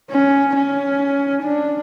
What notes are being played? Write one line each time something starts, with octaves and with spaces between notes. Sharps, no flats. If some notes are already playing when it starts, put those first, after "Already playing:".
C#4
C#4
D4